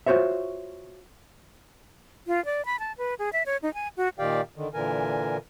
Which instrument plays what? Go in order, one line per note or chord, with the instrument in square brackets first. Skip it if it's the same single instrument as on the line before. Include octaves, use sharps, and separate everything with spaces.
[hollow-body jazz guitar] F4 F#4 G#4 C5 C#5 E5
[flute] F4
D5
B5
A5
B4
G#4
E5
C#5
D#4
G#5
F#4
[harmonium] A#2 D#3 G4 D5 F5 G5
D3 D#3
A#2 D3 E3 A#4 G#5